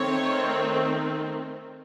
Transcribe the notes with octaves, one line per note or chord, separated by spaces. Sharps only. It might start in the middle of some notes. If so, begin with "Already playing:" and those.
Already playing: D#3 A3 C4 C#5